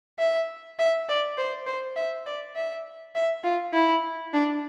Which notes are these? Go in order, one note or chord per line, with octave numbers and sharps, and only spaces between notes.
E5
E5
D5
C5
C5
E5
D5
E5
E5
F4
E4
D4